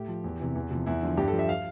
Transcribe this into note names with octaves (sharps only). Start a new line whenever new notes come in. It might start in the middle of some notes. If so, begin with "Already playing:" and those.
Already playing: A2 G4
F3
E2
C3 E3
E2
C3 F3
E2 E4
D3 F3
G2 G4
A4
F3
E5
F5